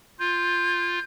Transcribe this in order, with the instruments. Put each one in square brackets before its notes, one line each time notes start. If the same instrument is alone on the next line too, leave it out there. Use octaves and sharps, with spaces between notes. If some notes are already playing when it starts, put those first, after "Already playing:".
[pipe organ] F4 [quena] G6